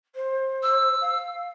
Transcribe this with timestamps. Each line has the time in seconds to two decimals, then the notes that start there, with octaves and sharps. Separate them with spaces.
0.15 C5
0.63 E6
1.01 F5